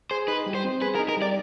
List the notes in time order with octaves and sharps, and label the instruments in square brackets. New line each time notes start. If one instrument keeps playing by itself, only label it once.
[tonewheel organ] G#4 [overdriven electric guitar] C5
[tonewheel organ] D#4 [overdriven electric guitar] B4
[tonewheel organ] G3
[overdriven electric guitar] C5
[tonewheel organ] C4
[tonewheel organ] G#4 [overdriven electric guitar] B4
[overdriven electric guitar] A#4
[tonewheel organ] D#4
[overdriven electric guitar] A#4
[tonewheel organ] G3 [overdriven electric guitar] D5